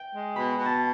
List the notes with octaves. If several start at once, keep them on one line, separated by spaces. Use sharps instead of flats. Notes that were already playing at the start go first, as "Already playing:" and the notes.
Already playing: G5
G#3
B2 B5
B2
A5